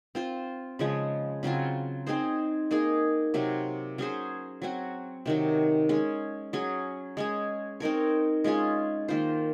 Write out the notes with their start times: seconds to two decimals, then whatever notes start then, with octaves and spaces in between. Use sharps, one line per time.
0.15 C4 F4 C5
0.79 C#3 F3 G#3
1.43 C#3 F#3 C4 F4
2.07 C4 D#4 G#4 C5
2.71 A#3 D#4 G#4
3.34 C3 F#3 C4
3.98 F#3 C#4 G#4 C5
4.62 F#3 C4 F#4
5.26 C3 D#3 F#3
5.89 G#3 C#4 G#4
6.53 F#3 C#4 G#4
7.17 G#3 C#4 G#4
7.80 C4 D#4 A#4 C#5
8.44 G#3 C#4 F4 G#4
9.08 D#3 A#3 F4 C5